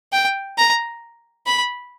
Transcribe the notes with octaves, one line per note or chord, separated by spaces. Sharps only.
G5
A#5
B5